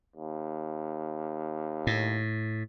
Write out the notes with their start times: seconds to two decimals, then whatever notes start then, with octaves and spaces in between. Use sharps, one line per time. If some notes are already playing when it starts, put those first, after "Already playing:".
0.16 D#2
1.87 A2